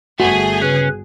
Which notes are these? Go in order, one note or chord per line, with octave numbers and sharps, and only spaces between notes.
G1 A3 F#4 G#4
C#3 C#4 B4